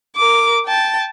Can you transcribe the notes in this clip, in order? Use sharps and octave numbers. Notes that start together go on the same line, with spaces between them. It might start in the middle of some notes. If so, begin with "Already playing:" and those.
A#4 D6
G5 A5